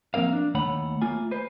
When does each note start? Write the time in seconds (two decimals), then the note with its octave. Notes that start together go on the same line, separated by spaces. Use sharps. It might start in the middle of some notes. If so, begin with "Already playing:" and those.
0.14 F3 A#3 C4 A#4 F5
0.33 D4
0.55 D#2 A3 C#5 F#5 B5
1.02 A3 A#3 F4 G#5
1.31 B4 C5